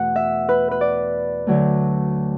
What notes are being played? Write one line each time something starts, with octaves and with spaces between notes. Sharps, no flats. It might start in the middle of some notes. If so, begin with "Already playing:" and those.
Already playing: E2 B2 A3 F#5
E5
B4
B4
D5
D2 D3 F#3 A3